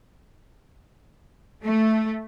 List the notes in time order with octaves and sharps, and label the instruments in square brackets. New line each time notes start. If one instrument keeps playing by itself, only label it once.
[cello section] A3